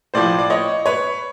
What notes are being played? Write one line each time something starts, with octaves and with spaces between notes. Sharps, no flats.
A2 F3 C5 D5
D5
C#5 D#5
B4 C#5